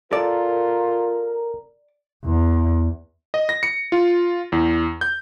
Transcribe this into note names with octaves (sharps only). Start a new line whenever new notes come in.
F4 A4 A#4 D5
E2
D#5
A#6
C#7
F4
E2
G6